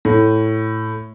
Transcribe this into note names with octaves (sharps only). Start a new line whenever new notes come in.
A2